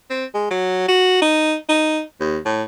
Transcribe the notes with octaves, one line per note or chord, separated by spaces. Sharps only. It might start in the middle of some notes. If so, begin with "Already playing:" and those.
C4
G#3
F#3
F#4
D#4
D#4
D#2
A2